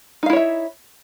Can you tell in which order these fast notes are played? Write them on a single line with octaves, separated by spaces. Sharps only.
D#4 F5 E4 C#5 E5